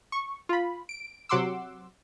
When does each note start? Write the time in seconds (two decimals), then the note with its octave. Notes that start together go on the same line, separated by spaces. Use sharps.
0.12 C#6
0.49 F4 B5
0.89 D7
1.29 C3 F#3 F#5 C6 D6 E6